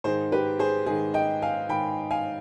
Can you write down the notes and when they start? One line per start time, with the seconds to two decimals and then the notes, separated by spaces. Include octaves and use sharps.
0.04 G#2 D#3 G#4 C5
0.32 G4 B4
0.59 G#4 C5
0.86 G#2 D#3 G#4
1.14 D#5 G5
1.42 F5 G#5
1.69 G#2 D#3 G5 B5
2.11 F5 G#5